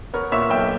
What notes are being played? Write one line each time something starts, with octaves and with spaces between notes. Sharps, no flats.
B3 A#4 C#5
A#2 C#5 E5
B1 E5 G5